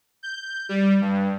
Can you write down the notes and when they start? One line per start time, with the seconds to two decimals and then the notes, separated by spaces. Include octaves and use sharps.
0.23 G6
0.69 G3
1.01 G2